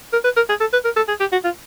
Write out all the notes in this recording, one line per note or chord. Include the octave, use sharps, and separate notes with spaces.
A#4
B4
A#4
G#4
A4
B4
A#4
A4
G#4
G4
F#4
F4